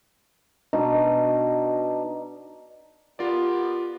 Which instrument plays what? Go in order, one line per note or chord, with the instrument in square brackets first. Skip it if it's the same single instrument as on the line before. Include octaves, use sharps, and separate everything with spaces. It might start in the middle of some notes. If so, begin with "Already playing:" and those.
[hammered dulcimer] B2 D4 D#4 D#5
[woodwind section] B3 G4 [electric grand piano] F4 A#4 D5